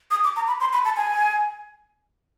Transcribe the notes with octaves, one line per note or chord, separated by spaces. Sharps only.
D#6
D6
A#5
B5
C6
B5
A5
G#5